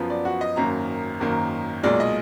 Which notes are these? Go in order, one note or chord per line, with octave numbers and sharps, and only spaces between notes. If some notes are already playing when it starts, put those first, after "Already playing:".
Already playing: F#2 F3 B3
D5
F#4
D#5
G#1 F#2 D#3 A#3 A#5
G#1 F#2 D#3 A#3
B1 A#2 G#3 D5
D#5